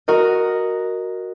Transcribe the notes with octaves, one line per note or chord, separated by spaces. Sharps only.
F#4 A#4 D#5